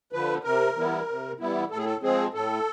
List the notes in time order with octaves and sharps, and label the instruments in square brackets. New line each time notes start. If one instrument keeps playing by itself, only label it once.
[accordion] D3 F3 B4
C3 A#4
E3 G3 B3 E4
C3
E3 G3 B3 E4
A2 A4
G#4
A4
F3 G#3 C4 G#4
A2 A4